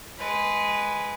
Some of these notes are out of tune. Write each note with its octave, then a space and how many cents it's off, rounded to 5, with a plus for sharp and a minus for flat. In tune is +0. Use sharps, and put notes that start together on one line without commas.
G#3 +0 B4 +0